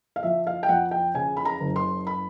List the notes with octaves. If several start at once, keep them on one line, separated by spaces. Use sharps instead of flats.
F5
F3 E5
F5
G5
F2 F#5
G5
C#3 G#5
B5
A#5
F#1
C6
B5